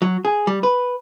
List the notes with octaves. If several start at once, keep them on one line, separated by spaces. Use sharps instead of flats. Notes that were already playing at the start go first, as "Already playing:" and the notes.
F#3
G#4
G3
B4